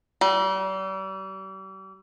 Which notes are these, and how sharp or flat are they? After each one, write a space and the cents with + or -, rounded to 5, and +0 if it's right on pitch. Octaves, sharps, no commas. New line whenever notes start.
G3 -40